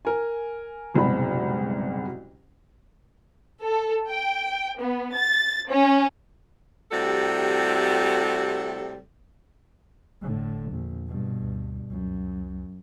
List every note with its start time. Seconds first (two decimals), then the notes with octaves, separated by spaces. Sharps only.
0.05 A#4 G#5
0.94 F#1 C2 G#2 B2 B5
3.64 A4
4.09 G5
4.78 B3
5.14 A6
5.71 C#4
6.91 A2 C3 G3 F#4 A4
10.21 F#1 A2 D3
10.71 A#1 E2
11.07 G2 B2
11.41 D2
11.90 C#2 F#2